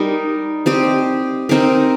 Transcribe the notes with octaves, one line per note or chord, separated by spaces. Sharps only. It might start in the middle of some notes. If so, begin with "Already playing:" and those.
Already playing: G3 D#4 A#4 D#5
C4 G4 D#5
C4 D#4 A#4